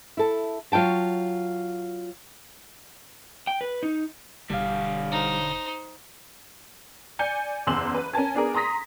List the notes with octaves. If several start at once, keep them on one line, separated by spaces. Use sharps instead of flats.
E4 A4
F#3 F4 C#5 G5 A5
G5
B4
D#4
E1 D3 G3 F5
D#4 C5
D5 G#5 G6 C#7
F#1 E2 C6 E6 F#7
B4
C#4 A#4 G#5 A5 G#6
B3 D4 G#4 A#4
A#5 C6 D#6 A#6 B6